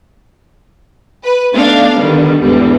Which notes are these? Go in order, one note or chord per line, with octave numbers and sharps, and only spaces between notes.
B4
A3 B3 D4 D#4 F5
D3 D#3 G3 B3
E2 G#2 D3 E3 G3